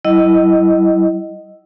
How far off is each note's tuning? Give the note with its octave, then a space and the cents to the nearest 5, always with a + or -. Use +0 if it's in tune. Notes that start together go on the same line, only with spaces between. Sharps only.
F#3 +45 E4 +0 D#5 +0